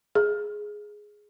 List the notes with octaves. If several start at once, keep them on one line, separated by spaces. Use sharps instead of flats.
G#4